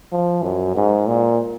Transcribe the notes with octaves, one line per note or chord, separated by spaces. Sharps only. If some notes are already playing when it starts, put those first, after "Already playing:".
F3
F#2
G#2
A#2